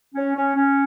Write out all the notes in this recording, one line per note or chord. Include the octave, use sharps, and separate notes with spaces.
C#4
C#4
C#4